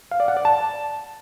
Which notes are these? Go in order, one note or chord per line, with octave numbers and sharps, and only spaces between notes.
F5
D5
F#5
D5
A5